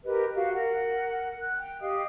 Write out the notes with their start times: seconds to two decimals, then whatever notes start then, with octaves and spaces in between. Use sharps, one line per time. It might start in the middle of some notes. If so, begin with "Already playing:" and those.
0.05 G4 A#4 B4 D#5
0.35 F#4 G4 F5
0.54 A#4 F#5
1.41 F#6
1.57 G5
1.82 G4 D#5 F5 D#6